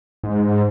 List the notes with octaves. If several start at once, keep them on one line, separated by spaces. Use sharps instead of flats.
G#2